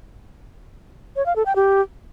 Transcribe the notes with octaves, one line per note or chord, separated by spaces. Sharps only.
C#5
F5
A4
G5
G4